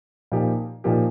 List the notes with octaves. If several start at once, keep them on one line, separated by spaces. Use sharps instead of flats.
A#2 F3 A#3 D#4 G4
A#2 F3 A#3 D#4 G4